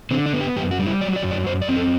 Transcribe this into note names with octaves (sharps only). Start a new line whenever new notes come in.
D3 C4
D4
B3
G4
F#2 G4
F#4
G3
E4
F#3 D5
D5
F#2
D5
F#2 C5
D5
C4
A4